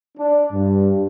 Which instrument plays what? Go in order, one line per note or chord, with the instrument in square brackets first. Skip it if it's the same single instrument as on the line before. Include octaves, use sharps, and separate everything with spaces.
[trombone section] D4
G2